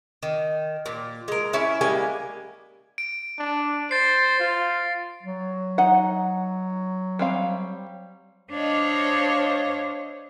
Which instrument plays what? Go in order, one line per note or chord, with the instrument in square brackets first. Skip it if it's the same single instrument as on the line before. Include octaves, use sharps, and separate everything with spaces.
[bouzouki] D#3
A#2
G#3 A#4
C#4 E4 E5
G3 G#3 A#3 G#5
[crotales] D7
[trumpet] D4
[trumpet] C5 [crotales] A6 C7
[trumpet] F4
[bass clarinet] F#3
[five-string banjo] D#4 F#5
G3 C4 F5
[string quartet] D4 C5 C#5 D#5 F5